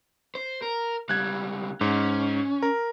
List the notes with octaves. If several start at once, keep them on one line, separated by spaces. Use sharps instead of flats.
C5
A#4
C#2 G3 F#6 G#6
G#2 C#4
A#4